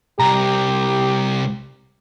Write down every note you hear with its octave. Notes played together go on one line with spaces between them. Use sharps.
C2 G4 A#5